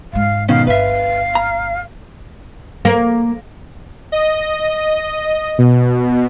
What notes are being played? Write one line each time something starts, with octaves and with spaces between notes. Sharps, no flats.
G#2 G#3 F5
B2 D#3 C#4 F5
G1 B4 E5 F5
A#5
A#3
D#5
B2